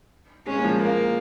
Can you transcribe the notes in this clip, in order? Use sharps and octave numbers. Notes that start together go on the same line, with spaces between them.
G#3 C#4
A#3
F3 G#3
A#3